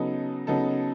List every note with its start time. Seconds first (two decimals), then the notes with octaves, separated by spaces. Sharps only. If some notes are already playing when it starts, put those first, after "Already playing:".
Already playing: C#3 F#3 B3 D#4 A4
0.47 C#3 F#3 B3 D#4 A4